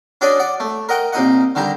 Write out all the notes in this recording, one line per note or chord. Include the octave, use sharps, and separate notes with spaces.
C#4 D4 F#4 G#4 D5 D#5
D5 F#5
A3
A#4 D#5 F#5 G5
C2 A#2 D#4 D#5 F#5
D3 D#3 G3 A#5